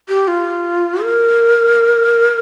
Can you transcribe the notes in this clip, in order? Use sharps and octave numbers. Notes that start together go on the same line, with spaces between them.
G4
F4
A#4